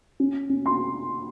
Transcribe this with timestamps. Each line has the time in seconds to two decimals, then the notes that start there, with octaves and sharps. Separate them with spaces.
0.20 C#4
0.49 C#4
0.66 C6